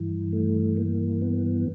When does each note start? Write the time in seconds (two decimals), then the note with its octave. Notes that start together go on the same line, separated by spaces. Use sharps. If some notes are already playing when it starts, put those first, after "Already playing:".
Already playing: G2 E3
0.33 A3
0.77 A#3
1.22 B3